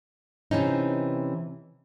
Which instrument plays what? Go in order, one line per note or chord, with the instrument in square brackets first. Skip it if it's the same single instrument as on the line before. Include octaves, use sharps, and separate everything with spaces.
[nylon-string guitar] C3 E3 C#4 D#4